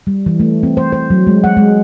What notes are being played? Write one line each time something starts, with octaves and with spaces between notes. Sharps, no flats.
G3
E3
A3
C4
C5
C5
F#3
G#3
F#5
G#3